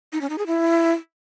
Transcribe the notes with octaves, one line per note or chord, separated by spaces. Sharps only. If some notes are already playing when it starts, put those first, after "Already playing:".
D#4
C#4
D#4
G#4
E4